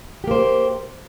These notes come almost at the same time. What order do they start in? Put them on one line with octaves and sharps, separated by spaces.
G4 A#3 C5